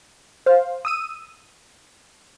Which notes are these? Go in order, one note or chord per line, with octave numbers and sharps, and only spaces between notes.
C5 F5
D#6 E6 D#7